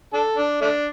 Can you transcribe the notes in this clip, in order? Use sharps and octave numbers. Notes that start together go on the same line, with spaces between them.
D4 A4
D4
A3 D4